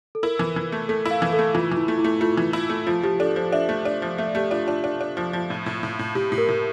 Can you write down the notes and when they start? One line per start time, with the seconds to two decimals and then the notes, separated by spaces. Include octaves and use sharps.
0.15 A4
0.23 E4 A#4
0.39 E3
0.56 E3
0.72 A3
0.89 A3 A4
1.05 E4
1.11 F5
1.22 E3
1.33 A4
1.39 A3
1.54 E3 F4
1.71 E3
1.77 E4
1.88 A3
1.99 E4
2.04 A3
2.21 A3 F4
2.37 E3
2.53 E4
2.70 A3
2.87 F3 F4
3.03 F3 G4
3.19 D4 A4
3.36 F3 C5
3.52 D4 E5
3.69 A3
3.85 D4
4.02 F3
4.18 A3 E5
4.35 A3 G4
4.51 D4 F4
4.67 D4 F4
4.84 D4
5.01 D4
5.17 F3
5.33 F3
5.50 A2
5.66 A2
5.83 A2
5.99 A2
6.15 A2 G4
6.32 A2
6.38 A#4
6.48 A2